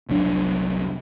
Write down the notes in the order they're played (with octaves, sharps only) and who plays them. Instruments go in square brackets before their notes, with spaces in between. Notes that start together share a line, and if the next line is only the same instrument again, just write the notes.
[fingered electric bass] F1 C2 F#3 D4